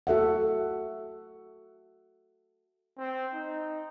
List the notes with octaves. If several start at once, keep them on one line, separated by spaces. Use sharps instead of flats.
F#4 A4 E5 F#5
C4
D#4